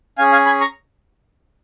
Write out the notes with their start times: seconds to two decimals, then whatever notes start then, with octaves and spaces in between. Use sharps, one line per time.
0.18 C#4 G#4 F5 G#5
0.32 F5 G#5
0.46 G#5 B5
0.60 A#5 C#6